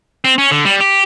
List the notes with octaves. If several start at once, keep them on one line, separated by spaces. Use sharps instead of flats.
C4
C#4
D3
G3
G4